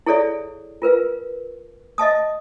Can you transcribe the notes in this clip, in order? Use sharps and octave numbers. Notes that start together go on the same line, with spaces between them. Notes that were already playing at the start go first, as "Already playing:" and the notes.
E4 G#4 A4 C#5 D5 E5
F4 A#4 B4 F5
D#5 E5 A5 D#6